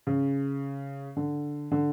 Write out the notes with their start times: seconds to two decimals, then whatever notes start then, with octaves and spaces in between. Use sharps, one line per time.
0.07 C#3
1.17 D3
1.71 D3